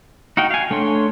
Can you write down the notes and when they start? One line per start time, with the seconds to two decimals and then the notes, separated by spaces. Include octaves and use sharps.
0.37 D#4 F#4 F5 G5
0.51 F5 G#5
0.71 A3 D4 C#5 C6